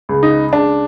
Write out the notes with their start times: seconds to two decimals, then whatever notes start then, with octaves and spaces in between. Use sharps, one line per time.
0.09 C#2
0.23 D#4
0.53 C#2 D4